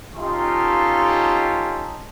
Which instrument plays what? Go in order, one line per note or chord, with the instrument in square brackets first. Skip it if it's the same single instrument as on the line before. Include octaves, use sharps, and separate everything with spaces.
[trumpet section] C#4 D#4 F4 G4 A4 C6